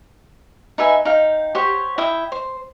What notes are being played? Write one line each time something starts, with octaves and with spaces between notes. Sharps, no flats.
D#4 B4 E5 G#5
D#4 F5 G5
G4 C5 C#5 F#5
E4 E5 G5 D#6
C5